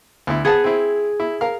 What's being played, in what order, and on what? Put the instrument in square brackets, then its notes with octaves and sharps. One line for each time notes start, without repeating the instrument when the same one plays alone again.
[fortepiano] D2 E4
[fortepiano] B3 F#5 A5 [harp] G#4
[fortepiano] C4 E4
E4
A#4 F5